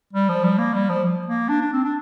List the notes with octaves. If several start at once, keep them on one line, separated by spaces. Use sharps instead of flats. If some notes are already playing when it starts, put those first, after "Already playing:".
G3
F3
G3
A#3
G3
F3
A#3
D4
D4
C4
D4